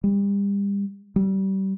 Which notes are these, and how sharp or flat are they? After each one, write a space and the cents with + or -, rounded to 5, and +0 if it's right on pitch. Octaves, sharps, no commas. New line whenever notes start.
G3 +35
G3 -30